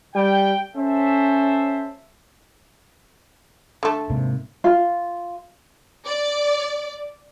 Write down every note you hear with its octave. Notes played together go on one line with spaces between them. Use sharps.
G3 G5
C#4 A4 C5 E5
D3 A3
G#2 C3 A#3
F4
D5